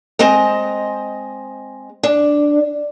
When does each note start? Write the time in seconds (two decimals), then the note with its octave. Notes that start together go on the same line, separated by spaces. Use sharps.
0.19 G#3 C4 D#5 A#5
2.03 D4